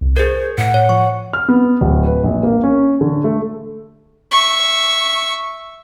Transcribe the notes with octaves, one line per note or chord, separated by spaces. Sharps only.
C2
G#4 A#4 C5 G#6
A2 F#5
C#5
F3 C#6
F6
B3
D1
B4
A#1
A#3
C#4
D3
A3
E5 C#6